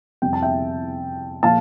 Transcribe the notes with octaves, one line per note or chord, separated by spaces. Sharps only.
F2 C3 G3 G5
A5
E5 G5
A#2 F3 F5 A5